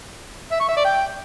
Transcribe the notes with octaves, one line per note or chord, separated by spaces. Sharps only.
E5
C#6
E5
D5
G5